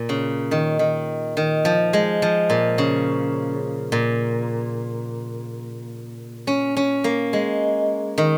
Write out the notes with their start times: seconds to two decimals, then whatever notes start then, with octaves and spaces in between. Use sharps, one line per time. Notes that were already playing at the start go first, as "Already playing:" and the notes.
Already playing: A#2
0.09 C#3
0.51 D#3
0.79 D#3
1.37 D#3
1.65 F3
1.93 G#3
2.22 F3
2.50 A#2
2.78 C#3
3.92 A#2
6.47 C#4
6.77 C#4
7.04 A#3
7.33 G#3
8.18 D#3